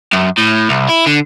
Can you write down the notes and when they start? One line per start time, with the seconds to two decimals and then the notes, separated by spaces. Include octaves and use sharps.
0.13 F#2
0.38 A2
0.69 C2
0.89 E4
1.07 D3